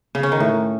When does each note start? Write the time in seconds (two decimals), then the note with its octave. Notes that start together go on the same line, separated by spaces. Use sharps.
0.15 C#3
0.23 C#4
0.32 D#3
0.40 A2